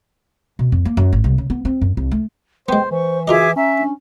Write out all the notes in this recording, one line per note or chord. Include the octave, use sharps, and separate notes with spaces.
B2
F2
A#3
F#2
G#1
C2
C#3
B3
C4
F#2
C2
A3
G#3 B3 C5 G5
E3 C5 C#6
F4 F#4 G#4 A#4 D#5 E5 D6
C#4 E5 A#5
D4